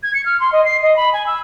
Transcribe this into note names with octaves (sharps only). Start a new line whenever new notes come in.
G#6
C#7
F6
C6
D#5
C7
D#5
B5
G#5
E6